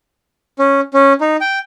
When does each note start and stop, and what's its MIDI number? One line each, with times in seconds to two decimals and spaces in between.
0.59 0.80 61
0.94 1.13 61
1.21 1.36 63
1.41 1.59 79